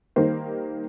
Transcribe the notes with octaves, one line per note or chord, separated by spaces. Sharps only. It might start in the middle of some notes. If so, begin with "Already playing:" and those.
D#3 G3 A#3 C5